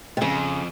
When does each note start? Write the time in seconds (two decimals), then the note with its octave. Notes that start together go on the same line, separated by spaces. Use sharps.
0.17 C3
0.22 F2 C#3